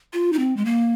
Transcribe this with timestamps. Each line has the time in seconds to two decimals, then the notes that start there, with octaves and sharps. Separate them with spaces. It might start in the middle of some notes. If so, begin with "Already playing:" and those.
0.13 F4
0.33 D#4
0.39 C4
0.57 G#3
0.65 A#3